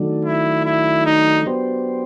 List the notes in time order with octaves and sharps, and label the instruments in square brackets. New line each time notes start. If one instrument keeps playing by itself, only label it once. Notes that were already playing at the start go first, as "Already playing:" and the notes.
Already playing: [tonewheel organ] D#3 F#3 A3 D4
[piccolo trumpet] E4
E4
D#4
[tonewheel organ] F#3 B3 D4 G4 C5